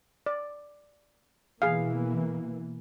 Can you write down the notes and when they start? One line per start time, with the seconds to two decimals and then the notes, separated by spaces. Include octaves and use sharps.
0.26 D5
1.62 B2 E3 A#3 G#4 F5